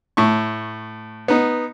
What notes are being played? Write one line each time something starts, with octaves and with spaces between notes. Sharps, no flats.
A2 C#6
B3 D#4